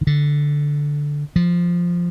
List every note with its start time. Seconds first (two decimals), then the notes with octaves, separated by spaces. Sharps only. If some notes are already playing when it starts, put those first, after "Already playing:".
0.01 D#3
0.07 D3
1.36 F3